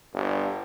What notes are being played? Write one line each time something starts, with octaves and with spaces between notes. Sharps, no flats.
G1